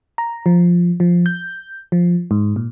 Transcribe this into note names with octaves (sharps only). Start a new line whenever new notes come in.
A#5
F3
F3
G6
F3
G#2
A#2